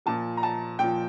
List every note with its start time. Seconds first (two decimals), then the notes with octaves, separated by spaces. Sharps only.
0.06 A#2 F3 A5
0.37 A#5
0.43 A5
0.79 A#2 F3 G5